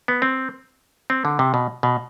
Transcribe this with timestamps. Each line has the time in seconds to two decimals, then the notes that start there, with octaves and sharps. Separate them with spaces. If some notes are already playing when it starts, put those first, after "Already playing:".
0.08 B3
0.22 C4
1.10 C4
1.25 D3
1.39 C3
1.54 B2
1.83 B2